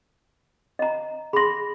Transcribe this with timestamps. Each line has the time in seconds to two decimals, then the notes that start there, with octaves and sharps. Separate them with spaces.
0.79 D#5 A#5
1.33 G#4 B5 C6 A#6